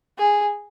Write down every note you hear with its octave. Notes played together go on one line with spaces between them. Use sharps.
G#4